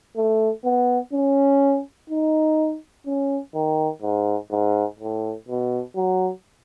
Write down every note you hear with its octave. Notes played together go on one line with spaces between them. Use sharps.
A3
B3
C#4
D#4
C#4
D#3
G#2
G#2
A2
B2
F#3